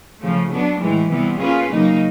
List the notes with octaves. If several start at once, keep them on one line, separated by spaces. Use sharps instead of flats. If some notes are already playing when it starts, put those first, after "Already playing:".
C#3 F3 A3
F#3 B3 D4
A2 E3 G#3
C3 E3 G3 B3
A#3 C#4 F4 G#4 B4
C#3 F#3 A#3 D#4